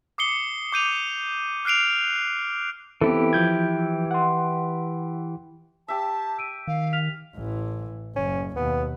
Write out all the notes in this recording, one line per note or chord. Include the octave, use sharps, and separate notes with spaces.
D6 D#6 C7 C#7 G7
D6 G6 D#7 F7
F6 F#6 C7 D7 F7
E3 B3 C4 E4 G4 A4
F3 G6 G#6
F#5 C6
G4 E5 A5
E6 D7 D#7
D#3 F5
F6 B6 F7
A1 E3
F#1 C#4
D#2 B2 B3